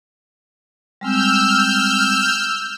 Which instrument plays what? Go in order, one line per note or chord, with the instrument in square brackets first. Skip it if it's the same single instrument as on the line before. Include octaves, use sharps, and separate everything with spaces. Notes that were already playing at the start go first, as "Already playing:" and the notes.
[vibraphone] G3 G#3 C4 [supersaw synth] E6 F6 G6